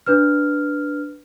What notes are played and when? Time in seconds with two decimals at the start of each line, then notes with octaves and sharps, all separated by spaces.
0.06 D4 B4 F6